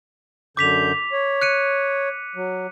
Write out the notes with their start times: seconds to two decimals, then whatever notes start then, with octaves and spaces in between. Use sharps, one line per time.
0.57 F#2 D3 D6 G6 B6 F7
1.12 C#5
1.42 F#6 C#7 D#7
2.36 F#3